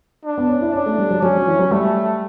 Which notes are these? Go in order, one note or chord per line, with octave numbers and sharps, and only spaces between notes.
D4
B3
C#4
E4
C#4 D4
A3
G3
F#3
F#3 C#4
F#3
E3
F#3
G3 A3